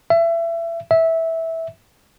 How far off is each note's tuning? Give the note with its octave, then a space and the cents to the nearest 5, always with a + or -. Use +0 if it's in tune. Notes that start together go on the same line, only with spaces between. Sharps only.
E5 +25
E5 -15